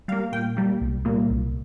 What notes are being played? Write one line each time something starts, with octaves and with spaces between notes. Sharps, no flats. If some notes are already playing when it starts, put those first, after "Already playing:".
G3 A#3 F5
A#2 G5
G3 A#3
C2
A#2 G3 A#3
C2